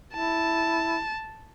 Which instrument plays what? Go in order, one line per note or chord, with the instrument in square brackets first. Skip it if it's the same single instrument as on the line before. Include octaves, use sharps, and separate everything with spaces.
[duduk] E4 [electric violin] A5